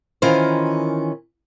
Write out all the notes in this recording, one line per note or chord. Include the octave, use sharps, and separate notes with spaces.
D#3 E3 C#4 F4 C5